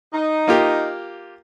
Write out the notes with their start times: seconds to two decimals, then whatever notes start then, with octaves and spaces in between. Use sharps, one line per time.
0.13 D#4
0.47 A#3 F4 G4